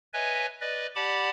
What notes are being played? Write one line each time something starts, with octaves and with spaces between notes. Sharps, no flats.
B4 C#5 D#5 E5 G#5
B4 D5 D#5
G4 D5 F#5 A5 B5 D6